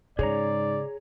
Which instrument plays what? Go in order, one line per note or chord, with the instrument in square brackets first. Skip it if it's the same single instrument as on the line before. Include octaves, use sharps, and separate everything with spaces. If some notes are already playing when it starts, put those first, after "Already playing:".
[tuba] G#2 [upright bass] C#3 [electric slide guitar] G#4 C#5 A#5 [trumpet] D5